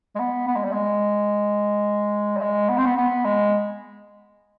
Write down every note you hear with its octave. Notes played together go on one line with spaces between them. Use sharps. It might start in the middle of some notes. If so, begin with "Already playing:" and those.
G#3
B3
B3
G#3
G3
G#3
G3
G#3
B3
C4
B3
B3
G#3